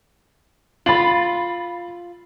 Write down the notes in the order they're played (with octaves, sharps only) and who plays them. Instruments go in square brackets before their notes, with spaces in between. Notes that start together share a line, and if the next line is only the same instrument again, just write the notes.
[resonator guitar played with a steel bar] F4 [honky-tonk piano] B5 A6 F#7